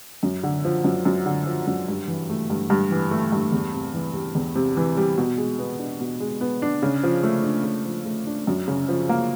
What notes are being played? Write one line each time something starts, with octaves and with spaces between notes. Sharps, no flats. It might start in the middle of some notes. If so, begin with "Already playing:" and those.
F#2
D3
F3
F#2
F#2
D3
F3
F#2
G2
E3
A3
G2
G2
E3
A3
G2
E2
C3
E3
G3
E2
C3
E3
G3
B2
G#3
B3
D4
B2
G#3
B3
D4
C#3
F3
A3
D4
C#3
F3
A3
D4
F#2
C#3
F3
A#3